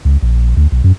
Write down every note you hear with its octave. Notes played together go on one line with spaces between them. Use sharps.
C#2
A#1
D2
B1
F#2